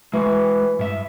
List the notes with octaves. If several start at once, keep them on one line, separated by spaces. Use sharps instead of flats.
E3 G#3 F#4
G2 E5